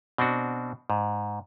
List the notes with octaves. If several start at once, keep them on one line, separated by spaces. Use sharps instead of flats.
B2 C4 D4 F#4
G#2